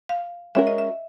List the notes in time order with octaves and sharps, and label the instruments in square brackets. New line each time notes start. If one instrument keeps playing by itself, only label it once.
[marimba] F5
[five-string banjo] G#3 C#4 F#4 A#4 [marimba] E5
[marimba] D#5
E5